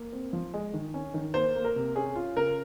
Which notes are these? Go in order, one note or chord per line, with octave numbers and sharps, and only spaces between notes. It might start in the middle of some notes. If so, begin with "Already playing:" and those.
Already playing: A#3
C4
F3
G#3
D#3
C#4
D#3
A#3 C5
A#3
A#4
C3
C#4 G#4
F4
C#3 A#4